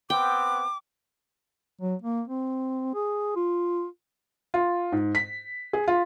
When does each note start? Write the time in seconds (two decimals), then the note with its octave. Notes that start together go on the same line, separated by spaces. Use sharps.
0.10 B3 C4 G5 D6
1.81 F#3
2.02 A#3
2.27 C4
2.94 G#4
3.36 F4
4.54 F4
4.92 G#2
5.15 B6
5.73 G#4
5.88 F4